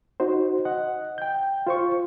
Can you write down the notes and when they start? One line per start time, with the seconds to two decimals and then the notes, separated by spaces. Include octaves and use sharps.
0.20 D#4 F#4 C5
0.65 D#5 F#5
1.18 G5 G6
1.67 F4 C5 C#6